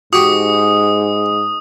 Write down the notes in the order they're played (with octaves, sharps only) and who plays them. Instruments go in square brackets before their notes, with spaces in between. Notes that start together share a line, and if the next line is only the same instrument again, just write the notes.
[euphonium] G#2 [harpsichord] F#4 G4 [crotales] D#6